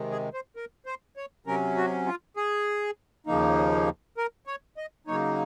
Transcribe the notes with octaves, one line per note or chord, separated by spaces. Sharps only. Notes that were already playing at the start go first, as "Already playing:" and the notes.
Already playing: C3 D#3 G#3
G#4
C5
A#4
C5
C#5
C3 F#3 C#4 A#4
F#4
F4
G#4
D#2 C#3 F3 A#3 D#4
A#4
C#5
D#5
C#3 F#3 A#3 D#4 C#5